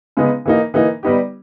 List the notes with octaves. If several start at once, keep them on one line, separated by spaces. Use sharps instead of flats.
C#3 G#3 B3 D#4
E3 A#3 D#4
E3 A#3 D#4
G3 B3 D#4 G4